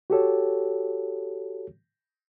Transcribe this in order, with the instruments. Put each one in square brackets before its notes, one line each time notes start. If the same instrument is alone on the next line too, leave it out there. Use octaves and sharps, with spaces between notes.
[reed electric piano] F#4 G4 A4 C#5